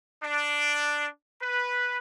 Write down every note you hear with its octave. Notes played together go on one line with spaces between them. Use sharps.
D4
B4